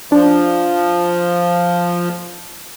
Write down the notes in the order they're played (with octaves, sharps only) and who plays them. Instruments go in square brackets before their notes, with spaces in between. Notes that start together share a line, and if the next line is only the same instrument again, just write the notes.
[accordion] F3 [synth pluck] D4